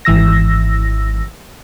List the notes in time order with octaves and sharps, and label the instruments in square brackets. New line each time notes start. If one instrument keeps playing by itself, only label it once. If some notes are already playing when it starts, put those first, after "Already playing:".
[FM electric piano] G#1 E3 E6 A#6